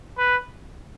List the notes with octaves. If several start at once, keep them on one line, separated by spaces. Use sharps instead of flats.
B4